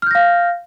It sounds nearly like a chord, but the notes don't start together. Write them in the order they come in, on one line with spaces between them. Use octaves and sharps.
F6 G6 A#6 F5